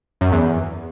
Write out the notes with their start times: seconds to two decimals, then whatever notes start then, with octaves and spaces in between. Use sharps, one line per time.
0.21 F#2
0.32 E2